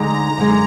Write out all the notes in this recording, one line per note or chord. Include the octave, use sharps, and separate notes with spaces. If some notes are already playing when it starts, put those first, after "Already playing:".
Already playing: D2 D3 G#3 D#4 A#5
F#2 D3 G#3